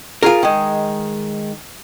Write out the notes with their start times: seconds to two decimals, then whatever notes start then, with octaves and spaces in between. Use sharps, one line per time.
0.23 F4 G#4 A#4
0.43 D#3 G#3